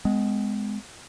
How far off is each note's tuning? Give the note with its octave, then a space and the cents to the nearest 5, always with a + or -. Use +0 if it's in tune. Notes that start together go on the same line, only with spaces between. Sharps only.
G#3 +0 B3 +40